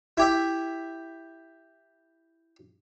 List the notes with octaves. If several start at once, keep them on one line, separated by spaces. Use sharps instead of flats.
E4 G4 E5